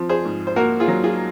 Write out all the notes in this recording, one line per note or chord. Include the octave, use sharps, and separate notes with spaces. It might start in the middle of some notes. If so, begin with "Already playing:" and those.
Already playing: F3 C4
G#4 C5
G#2
C5
A#3 F#4 A#4
F4 G#4
F#3
F4 G#4